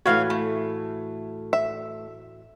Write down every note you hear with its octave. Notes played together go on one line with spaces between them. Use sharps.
A2 E3 F#4 B4 C#5 F5
A3
E5